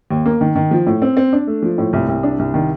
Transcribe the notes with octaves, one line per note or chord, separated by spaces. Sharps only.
D#2
A#3
D#3
D#3
F3
A2
C4
C4
D4
A3
F3
A2
C2
C2
D4
C2
D#3